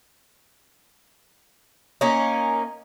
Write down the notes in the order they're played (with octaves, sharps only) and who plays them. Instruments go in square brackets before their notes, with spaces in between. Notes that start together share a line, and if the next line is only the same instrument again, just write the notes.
[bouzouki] A#3 C#4 D#4